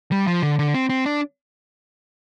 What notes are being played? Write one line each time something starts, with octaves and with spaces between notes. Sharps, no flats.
G3
F3
D3
D3
C4
C4
D4